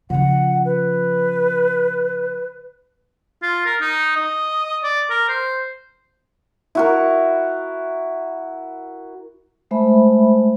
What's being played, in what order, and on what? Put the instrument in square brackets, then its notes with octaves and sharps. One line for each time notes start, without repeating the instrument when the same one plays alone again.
[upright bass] C#3 F3 [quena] F#5
[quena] B4
[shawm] F4
A#4
D#4
D#5
D5
A#4
C5
[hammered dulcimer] E4 F#4 A#4
[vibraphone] G#3 A3 C5 E5 B5